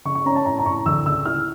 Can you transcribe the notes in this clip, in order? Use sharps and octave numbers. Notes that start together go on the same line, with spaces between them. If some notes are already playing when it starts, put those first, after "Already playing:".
C#3 C#6
C#6
C#4 A#5
A5
A2 A#5
A#5
A2 C#6
D2 E6
C#3 E6
E4 F6